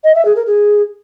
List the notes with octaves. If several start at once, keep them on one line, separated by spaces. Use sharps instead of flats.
D#5
E5
G#4
A#4
G#4